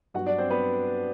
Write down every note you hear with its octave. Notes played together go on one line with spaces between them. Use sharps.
G2 F#3 B3 F#4 F#5
D4 D5
C4 C5
B3 B4